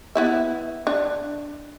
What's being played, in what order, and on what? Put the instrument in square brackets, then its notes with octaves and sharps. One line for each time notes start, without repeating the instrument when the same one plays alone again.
[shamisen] B3 E4 E5
D4